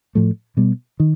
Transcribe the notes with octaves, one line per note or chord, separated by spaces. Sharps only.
A2 F3 A3
B2 G3 B3
D#3